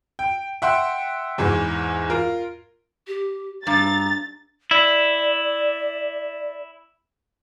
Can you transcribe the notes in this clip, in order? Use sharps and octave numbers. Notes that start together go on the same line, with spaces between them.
G5
E5 F#5 G5 C6
E2 G#2 E3
F4 A#4
G4
G2 A#5 A6
E4 D5